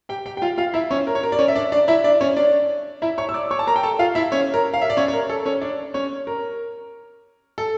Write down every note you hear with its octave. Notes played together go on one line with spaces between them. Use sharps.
G4 G5
G4 G5
G5
F4 F5
F4 F5
E4 E5
C#4 C#5
A#4
C#5
A#4
D5
C#4 C#5
E5
D4 D5
D4 D5
E4 E5
D4 D5
C#4 C#5
D4 D5
E4 E5
C#5 C#6
E6
D5 D6
C#5 C#6
A5
A#4 A#5
G5
A4 A5
F4 F5
E4 E5
C#4 C#5
A#4
F5
E5
D5
C#4 C#5
C#5
A#4
A4
C#4 C#5
D4 D5
C#4 C#5
A#4
A4